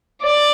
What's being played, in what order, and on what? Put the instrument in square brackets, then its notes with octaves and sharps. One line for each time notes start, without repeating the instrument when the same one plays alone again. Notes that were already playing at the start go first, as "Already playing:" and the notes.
[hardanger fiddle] D5